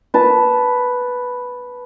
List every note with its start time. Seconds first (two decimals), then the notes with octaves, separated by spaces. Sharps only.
0.14 B4 A5